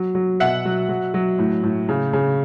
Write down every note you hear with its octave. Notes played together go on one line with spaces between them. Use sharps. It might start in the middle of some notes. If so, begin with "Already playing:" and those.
Already playing: F#3
F#3
B2 E5 F#5
F#3
F#3
F#3
A2
A2
C#3
C#3